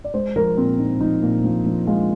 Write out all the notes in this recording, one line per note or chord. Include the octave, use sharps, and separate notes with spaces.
D5
G#3 C5
F3 A#4
A#2 C4
A#2 D#4
F3 D#4
A#2
F3
F3
G#3 F4